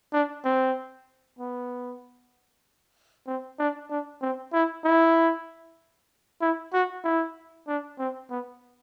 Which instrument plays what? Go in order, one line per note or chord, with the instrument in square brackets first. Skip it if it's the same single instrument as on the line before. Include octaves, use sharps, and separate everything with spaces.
[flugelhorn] D4
C4
B3
C4
D4
D4
C4
E4
E4
E4
F#4
E4
D4
C4
B3